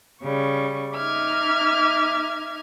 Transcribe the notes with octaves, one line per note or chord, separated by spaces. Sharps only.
C#3 G3 C#6
D#4 E5 D6 F6 G#6